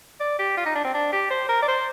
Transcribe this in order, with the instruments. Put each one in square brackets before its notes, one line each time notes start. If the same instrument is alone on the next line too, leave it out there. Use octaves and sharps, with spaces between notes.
[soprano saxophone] D5
G4
F4
D#4
D4
C4
D4
G4
C5
A#4
D5
C5